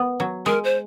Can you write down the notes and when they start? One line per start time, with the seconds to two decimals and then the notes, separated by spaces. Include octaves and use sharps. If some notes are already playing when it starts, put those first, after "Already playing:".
Already playing: B3
0.20 F#3
0.46 G#3 A#4
0.64 C5